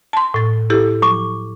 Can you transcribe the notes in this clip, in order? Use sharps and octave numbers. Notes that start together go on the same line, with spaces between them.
A5 C6
A2 A6
E4 G4 A4
C#6 D6